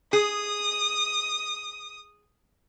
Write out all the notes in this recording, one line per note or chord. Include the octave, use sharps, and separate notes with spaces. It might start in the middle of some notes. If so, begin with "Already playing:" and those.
G#4 D#6